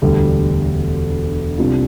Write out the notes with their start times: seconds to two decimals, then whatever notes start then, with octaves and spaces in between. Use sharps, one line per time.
0.02 E1 D2 D3 G3
1.58 C2 C3 G3 D4 F4